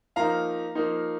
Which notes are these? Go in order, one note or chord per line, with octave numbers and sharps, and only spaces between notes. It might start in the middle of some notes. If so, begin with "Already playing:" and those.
F3 A#3 D#4 F5 A#5
F3 A#3 D#4